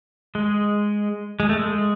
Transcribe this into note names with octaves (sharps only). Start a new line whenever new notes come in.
G#3
G#3
A3
G#3